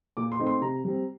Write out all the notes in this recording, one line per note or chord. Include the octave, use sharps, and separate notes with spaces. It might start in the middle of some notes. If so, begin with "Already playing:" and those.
A#2 D6
C6
A3 C4 D#4
C6
C3 A#5
G3 C4